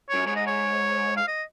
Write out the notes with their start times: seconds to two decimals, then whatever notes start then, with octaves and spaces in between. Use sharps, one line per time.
0.09 F#2 C#5
0.26 G#2 C#5
0.36 D#5
0.47 C#5
1.17 F5
1.28 D#5